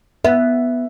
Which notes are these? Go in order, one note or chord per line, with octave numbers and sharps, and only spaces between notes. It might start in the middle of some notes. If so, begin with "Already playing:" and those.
B3 E5